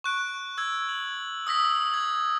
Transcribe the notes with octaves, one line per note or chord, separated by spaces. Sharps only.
C#6 F#6 D7
E6 G#6
F#7
D#6 E6 A#6 B6
G#6